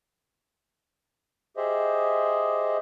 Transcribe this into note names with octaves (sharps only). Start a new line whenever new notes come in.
G4 G#4 C5 D#5 E5